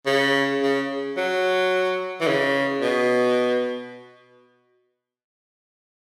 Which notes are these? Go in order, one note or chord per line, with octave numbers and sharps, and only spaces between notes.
C#3
C#3
F#3
E3
C#3
B2